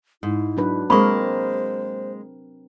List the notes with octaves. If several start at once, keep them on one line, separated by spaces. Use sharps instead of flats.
G#2 E4
F#3 D4 B4
G#3 A#3 C4 A#4 C5 B5 C#6